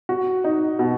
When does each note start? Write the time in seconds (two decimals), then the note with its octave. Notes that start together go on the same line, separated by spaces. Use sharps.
0.09 F#4
0.44 D#4
0.79 B2